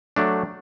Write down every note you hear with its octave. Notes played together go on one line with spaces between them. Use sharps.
F#3 A3 D4